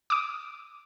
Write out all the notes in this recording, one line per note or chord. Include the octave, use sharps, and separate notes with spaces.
D6 D#6